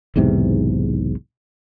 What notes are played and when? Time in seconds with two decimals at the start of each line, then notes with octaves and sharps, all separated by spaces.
0.16 B1 E2 G#2 C3